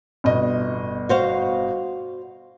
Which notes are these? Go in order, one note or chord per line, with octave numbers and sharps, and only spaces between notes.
G1 B2 D#5
F#4 C5 F5